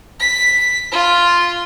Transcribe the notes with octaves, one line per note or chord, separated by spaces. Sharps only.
B6
F4